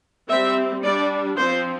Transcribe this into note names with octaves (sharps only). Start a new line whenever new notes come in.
G3 C4 E5
G3 D4 D5
F3 C4 C5